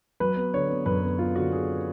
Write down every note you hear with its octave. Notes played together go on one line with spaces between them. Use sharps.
F#3 B4
B3
D3 C#5
B3
F#2 B4
B3
B3 F4
D3 F#4
B3 G#4